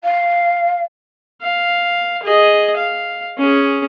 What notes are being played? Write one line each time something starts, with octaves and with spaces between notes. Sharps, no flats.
F5
F5
G#4 D#5
F5
C#4 G#4